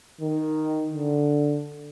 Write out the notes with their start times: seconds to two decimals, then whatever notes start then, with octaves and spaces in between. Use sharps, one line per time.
0.21 D#3
0.94 D3